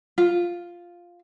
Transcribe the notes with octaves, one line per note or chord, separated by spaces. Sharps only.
F4